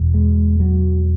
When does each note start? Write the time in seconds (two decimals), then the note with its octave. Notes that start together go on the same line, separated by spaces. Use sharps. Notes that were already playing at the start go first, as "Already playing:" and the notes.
Already playing: E1 E2 B2
0.14 G#3
0.60 F#3